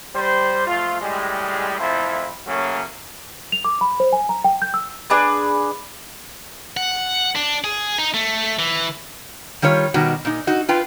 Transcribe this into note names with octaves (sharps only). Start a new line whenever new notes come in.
G3 C5
F3 A3 F4
A2 G3 G#3
A1 F2 E4 A4 C5
C#3 F#3 A3 A#3 C#4
F7
D6
B5
C5
G#5
A#5
G5
G6
E6
D4 G#4 B4
F#5
D4
G#4
D#4
A3
E3
D#3 G3 F4 C#5
B2 D#3 G3 F#4
A#2 D#4
D#4 F#4
F4 B4 G5